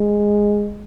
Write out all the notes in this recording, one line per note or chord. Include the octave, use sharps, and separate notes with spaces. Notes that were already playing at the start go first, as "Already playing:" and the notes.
Already playing: G#3